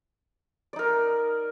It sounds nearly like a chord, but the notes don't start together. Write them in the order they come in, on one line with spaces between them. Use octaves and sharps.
D5 D#4 A#4